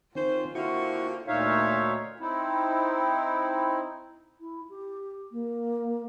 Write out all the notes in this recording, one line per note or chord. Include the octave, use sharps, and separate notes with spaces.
D#3 C4 C#4 F4 C5
D3 A#3 C4 E4 F#4 C#6
D2 A#2 D#4 C#5 E5 F5
C4 D#4 E4
E4
G4
A#3